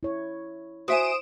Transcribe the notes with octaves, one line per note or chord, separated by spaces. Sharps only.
E4 C#5
F#4 C5 E5 G#5 D#6 D7 E7